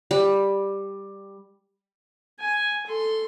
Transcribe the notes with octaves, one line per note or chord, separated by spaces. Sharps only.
G3
G#5
A4 C6